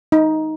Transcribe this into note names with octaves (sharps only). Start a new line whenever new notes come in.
D#4